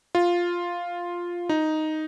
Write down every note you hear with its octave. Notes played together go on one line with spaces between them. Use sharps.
F4
D#4